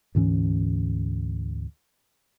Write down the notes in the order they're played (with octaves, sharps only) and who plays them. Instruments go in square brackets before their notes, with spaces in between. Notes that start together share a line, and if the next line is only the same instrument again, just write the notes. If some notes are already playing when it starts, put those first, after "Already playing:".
[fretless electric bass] D2 G#2 E3 C#4